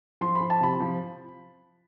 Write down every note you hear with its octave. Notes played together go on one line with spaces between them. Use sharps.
F3 C6
B5
F3
A5
C3 B5
F3